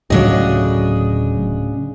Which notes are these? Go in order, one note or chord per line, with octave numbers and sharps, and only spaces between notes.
D1 A2 C#3 F#3 D4 D#5